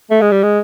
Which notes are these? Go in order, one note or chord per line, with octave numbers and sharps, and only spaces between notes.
A3
G#3
G3
G#3